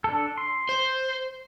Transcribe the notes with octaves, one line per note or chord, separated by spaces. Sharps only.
D4 A4
C6
C5